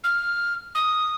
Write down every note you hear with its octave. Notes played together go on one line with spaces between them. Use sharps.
F6
D#6